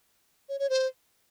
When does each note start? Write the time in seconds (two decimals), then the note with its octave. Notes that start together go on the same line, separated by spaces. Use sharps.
0.49 C#5
0.59 C#5
0.70 C5